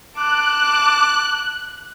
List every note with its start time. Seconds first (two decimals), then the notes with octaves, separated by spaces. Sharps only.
0.17 A5 D6 F#6